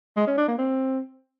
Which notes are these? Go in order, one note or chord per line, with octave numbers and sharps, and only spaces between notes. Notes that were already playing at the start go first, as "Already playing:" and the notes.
G#3
C#4
D4
A#3
C4